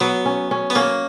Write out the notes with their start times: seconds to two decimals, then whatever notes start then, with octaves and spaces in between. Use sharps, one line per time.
0.01 F#3 B3
0.25 C#4
0.51 C#4
0.70 B3
0.75 A#3 C#4